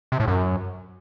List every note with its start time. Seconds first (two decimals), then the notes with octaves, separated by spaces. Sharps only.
0.12 C3
0.20 A2
0.28 F#2